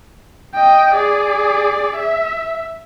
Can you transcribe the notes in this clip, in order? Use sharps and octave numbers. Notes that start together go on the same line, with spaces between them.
D#5 G5
G#4 D5
E5